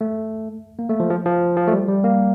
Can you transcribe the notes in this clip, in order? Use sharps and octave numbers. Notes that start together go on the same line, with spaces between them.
A3
A#3
A3
F3
F3
F3
F3
A3
G3
G3
A#3